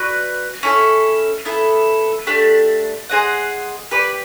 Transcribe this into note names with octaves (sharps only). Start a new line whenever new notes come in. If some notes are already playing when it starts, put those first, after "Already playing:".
Already playing: F#4 B4 D5
C#4 E4 A4
B3 E4 A4
A3 D4 G4
G#4 C5 D#5 F#5
G4 B4 D5